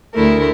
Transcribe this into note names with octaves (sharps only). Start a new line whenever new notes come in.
D2 D3 A3 E4 A#4